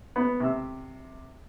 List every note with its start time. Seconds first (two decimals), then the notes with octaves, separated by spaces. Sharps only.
0.16 B3
0.40 C3 E6